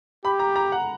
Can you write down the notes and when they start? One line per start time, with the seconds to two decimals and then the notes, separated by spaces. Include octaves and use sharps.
0.25 G4 B5
0.39 A#5
0.56 A#5
0.72 F#5